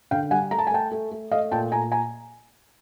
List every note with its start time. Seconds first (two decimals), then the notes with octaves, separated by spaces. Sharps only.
0.11 D3 F5 G5
0.31 G3 F#5 G#5
0.51 A3 A#5
0.58 A5
0.67 G#5
0.71 A3 G5 A5
0.91 A3
1.11 A3
1.31 A3 D#5 F5
1.51 A#2 G5 A5
1.71 A#2 G#5 A#5
1.92 G#5 A#5